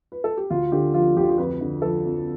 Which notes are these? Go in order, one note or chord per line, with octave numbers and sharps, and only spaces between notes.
B4
A4
G4
D2 F4
D3 G4
F3 F4
D2 G4
F4
G4
F2 B4
D3
F3 A4
F2